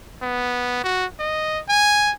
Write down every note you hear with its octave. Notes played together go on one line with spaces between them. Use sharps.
B3
F#4
D#5
G#5